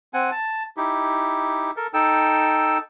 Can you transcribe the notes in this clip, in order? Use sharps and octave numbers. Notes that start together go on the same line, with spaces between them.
C4 F#5 G#5
A5
D#4 E4 G4
A4 A#4
D#4 A4 G5 E6